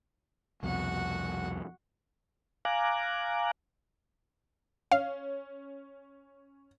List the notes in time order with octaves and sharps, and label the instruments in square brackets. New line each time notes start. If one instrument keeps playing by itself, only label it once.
[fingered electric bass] C2 F2 B2 [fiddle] F#4 F#5
[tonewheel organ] F5 G#5 A#5 D6 F#6
[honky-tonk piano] C#4 [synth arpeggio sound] F5